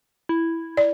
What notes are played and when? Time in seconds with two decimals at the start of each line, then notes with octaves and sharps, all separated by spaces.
0.29 E4
0.77 D5